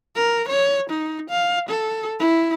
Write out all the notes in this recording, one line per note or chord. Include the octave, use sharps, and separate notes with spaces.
A#4
C#5
D#4
F5
A4
E4